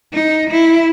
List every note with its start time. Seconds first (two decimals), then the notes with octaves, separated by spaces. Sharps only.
0.13 D#4
0.51 E4